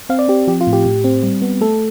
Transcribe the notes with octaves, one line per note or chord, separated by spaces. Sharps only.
C4 F5
D5
C4 G4
F3 G4
F4
A2
G4
A2
C4
G3
B3
A3 A4